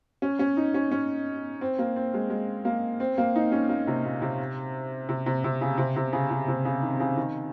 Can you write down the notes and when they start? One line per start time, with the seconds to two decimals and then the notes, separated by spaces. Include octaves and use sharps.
0.22 C#4
0.39 C#4
0.57 D#4
0.74 C#4
0.91 C#4
1.61 C4
1.79 A#3
1.96 C4
2.14 G#3
2.30 G#3
2.65 A#3
3.00 C4
3.18 A#3
3.35 D#4
3.52 C#4
3.69 A#3
3.87 C3
4.05 A#2
4.22 C3
5.09 C3
5.26 C3
5.44 C3
5.61 C#3
5.78 C3
5.96 C3
6.13 C#3
6.30 C#3
6.48 C3
6.65 C#3
6.82 D#3
7.00 C#3
7.17 D#3